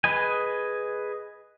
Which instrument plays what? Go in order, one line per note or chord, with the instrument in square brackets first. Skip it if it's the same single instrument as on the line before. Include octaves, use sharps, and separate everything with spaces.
[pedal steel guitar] G#4 B4 D#5 G#5